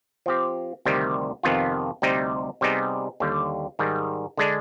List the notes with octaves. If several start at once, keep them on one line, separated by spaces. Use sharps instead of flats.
F3 C4 G4
D2 C3 D#3 G3
F2 C3 D#3 B3 F4
D2 C3 G3 C4 D#4
C3 G3 B3 D#4 G#4
D#2 D3 G3
G#2 D#3 G3
D3 G#3 D4